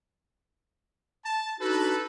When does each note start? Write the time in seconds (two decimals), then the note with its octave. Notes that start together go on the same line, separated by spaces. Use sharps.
1.25 A5
1.60 D4 D#4 F#4 A4 B4